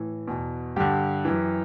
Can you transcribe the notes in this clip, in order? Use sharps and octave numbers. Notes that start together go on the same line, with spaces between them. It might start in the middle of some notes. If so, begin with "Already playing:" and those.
Already playing: A2 E3
E2 B2
G2 D3 G4
F#2 E3